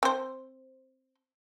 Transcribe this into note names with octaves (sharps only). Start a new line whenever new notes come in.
C4 C5